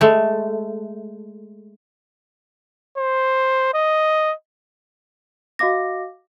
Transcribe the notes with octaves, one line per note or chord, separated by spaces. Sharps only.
G#3 A3
C5
D#5
F#4 D#5 F5 D6 A#6